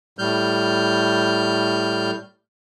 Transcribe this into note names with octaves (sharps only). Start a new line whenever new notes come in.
A2 G3 F6 G6